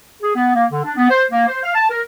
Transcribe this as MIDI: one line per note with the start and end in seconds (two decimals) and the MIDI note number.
0.22 0.33 68
0.35 0.52 59
0.55 0.65 58
0.70 0.84 50
0.84 0.93 62
0.97 1.06 59
1.10 1.23 72
1.31 1.45 58
1.47 1.58 72
1.63 1.74 77
1.75 1.86 81
1.90 2.01 70